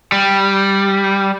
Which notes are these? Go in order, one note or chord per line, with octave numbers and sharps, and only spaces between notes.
G3